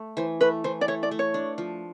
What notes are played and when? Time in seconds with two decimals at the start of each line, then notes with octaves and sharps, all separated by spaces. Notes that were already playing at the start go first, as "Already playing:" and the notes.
Already playing: A3
0.17 E3 C5
0.41 A3 B4
0.64 E3 C5
0.81 D5
0.88 A3 C#5
1.03 D5
1.11 A3
1.19 C#5
1.34 D4
1.58 F3